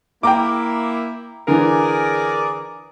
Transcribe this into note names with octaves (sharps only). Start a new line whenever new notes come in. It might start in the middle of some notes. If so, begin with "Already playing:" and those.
A#3 E4 G5 A#5 D6
D3 E3 G#4 A#4 D5